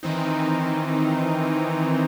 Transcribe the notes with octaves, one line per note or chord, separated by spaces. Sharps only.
D#3 E3 C4 D#4